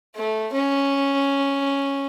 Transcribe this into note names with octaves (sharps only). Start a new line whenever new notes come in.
A3
C#4